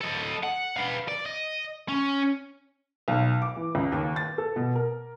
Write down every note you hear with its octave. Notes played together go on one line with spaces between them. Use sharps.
A4 D#5
F#5
B4 F5
D5
D#5
C#4
B1
D6
E3
C#2
D#2
A6
A4
B2
A#4